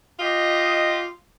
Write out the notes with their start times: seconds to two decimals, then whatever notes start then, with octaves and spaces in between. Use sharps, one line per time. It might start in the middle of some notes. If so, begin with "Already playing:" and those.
0.19 F4 G4 D#5